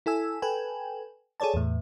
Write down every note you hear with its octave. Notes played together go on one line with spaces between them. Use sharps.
E4 A4 G#5 E6
A4 B4 G5 G#5
G#4 A4 C#5 D5 A5
E2 A2